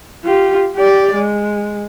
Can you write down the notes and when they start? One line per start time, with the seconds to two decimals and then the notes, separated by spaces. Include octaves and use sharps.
0.24 F4 G4
0.75 G4 D5
1.15 G#3